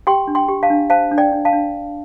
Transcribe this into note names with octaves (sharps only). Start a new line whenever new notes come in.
G4 G5 C6
D4
G5 C6
G4
F5 A5
D4
C5 F5 A5
D4
D5 G5
D4
F5 A5
D4